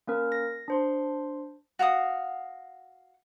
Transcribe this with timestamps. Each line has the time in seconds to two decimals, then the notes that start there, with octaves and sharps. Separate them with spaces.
0.08 A#3 C#4 A#4
0.32 A#6
0.68 D4 C5 C6
1.79 F#4 F5 G#5 D#6